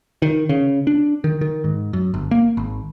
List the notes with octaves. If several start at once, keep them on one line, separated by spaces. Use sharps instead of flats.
D#3
C#3
D4
D#3
D#3
G#2
F#2
G1
A#3
G#1